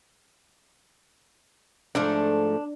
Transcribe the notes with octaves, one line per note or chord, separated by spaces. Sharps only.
G#2 F3 A3 D4